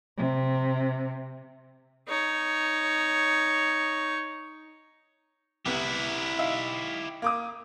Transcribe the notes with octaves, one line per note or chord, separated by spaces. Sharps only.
C3
D#4 C#5
C2 B3 E4 G4
D#4 E5 F5
A#3 D6 D#6